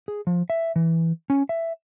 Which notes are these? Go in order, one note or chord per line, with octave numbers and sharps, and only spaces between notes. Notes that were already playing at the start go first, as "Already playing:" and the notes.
G#4
F3
E5
E3
C#4
E5